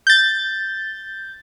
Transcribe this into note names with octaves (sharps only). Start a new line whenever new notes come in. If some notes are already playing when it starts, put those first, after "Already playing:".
G6 A6